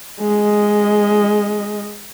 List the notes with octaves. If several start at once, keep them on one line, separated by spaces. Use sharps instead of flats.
G#3 D#5